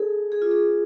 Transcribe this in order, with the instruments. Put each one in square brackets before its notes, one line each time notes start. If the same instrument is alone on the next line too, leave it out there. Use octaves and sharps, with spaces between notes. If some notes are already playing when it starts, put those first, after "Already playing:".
Already playing: [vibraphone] G#4 A4
G#4
F4
G#4